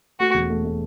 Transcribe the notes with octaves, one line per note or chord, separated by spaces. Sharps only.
A3 F#4
E1
A3
A3